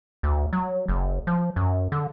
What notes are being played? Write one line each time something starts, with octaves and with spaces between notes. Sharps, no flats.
D2
F#3
F#1
F3
F#2
D3